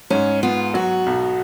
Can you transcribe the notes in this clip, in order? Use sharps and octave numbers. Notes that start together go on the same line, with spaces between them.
G#2 C#4
B3 F4
F#3 F#4
B1